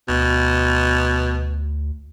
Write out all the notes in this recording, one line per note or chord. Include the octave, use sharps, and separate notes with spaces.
D2 B2